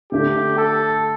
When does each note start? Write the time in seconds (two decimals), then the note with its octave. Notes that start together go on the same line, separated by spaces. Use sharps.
0.12 D3 A3 D4 G4
0.58 A4